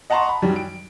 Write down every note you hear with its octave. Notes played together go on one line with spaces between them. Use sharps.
D#5 F#5 A5 A#5 C6 C#6
B5
F#2 D#3 F#3 G3
D7